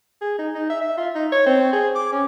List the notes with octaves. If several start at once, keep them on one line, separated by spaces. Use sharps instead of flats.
G#4
D#4
D#4
E5
E5
F4
D#4
C#5
C4
G#4
D6
C#4